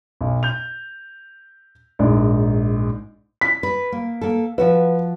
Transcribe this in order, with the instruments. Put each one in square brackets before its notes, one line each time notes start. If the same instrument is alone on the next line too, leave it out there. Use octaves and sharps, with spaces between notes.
[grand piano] B1
G6 F7
A#1 G#2 D5
[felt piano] B6
[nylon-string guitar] B4
A#3
A#3 A4
[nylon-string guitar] F3 F#4 E5 [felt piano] B4